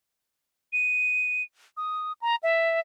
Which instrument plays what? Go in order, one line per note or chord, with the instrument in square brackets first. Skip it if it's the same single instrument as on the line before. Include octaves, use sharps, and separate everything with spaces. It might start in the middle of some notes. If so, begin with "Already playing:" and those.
[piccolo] D#7
D#6
A#5
E5